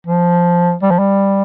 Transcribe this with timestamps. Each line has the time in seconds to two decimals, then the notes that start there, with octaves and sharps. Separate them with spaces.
0.07 F3
0.82 G3
0.91 F3
0.99 G3